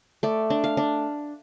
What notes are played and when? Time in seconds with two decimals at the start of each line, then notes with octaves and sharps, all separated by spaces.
0.23 A3 D5
0.50 D4
0.64 F5
0.77 D4